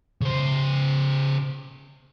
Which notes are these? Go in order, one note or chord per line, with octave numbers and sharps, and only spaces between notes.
C#3 C5